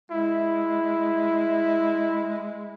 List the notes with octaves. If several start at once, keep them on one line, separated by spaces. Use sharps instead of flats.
G#3 E4